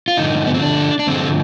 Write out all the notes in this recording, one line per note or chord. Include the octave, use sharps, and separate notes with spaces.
F4
G2 D3 F3 D#4
B3
C4
D4
D4
G2 D3 F3 C4